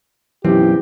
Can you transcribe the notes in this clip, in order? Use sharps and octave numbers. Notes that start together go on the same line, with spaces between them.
B1 F#2 E3 C4 G4